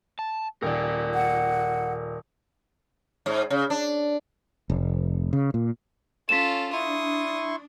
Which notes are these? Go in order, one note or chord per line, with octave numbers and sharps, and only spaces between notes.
A5
D#1 A#4 D5
F#5
G#2
C#3
D4
F1
C#3
A#2
C#4 F4 A4 B6 E7
D4 E4 C6 C#6 D#6